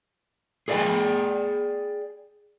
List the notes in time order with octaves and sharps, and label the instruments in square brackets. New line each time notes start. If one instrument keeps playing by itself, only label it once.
[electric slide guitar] G#4 A4 D5 E5 G5 G#5